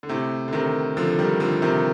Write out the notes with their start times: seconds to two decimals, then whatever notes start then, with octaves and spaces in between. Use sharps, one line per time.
0.03 D3
0.09 A2 C3
0.48 D3
0.53 C3 D#3
0.97 D3 F3
1.19 D#3 G3
1.40 D3 F3
1.62 C3 D#3